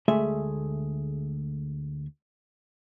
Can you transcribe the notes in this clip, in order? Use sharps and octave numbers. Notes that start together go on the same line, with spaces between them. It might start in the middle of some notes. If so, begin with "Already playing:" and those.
D2 G#3 A3 G#4 E5